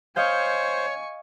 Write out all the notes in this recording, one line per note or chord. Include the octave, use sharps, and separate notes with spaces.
C5 C#5 D#5 F5 G#5 C#6 G6